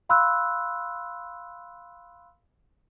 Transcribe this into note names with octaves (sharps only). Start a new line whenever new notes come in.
F5 B5 C6 E6 F#6